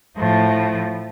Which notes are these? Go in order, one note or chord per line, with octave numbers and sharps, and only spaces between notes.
A2 F3